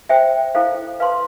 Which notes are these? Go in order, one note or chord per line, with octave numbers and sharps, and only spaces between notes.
C5 E5 G5
E4 A4 C5 F5
B4 F5 A5 C6